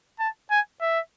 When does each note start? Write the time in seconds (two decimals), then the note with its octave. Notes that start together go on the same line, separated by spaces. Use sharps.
0.20 A5
0.51 G#5
0.81 E5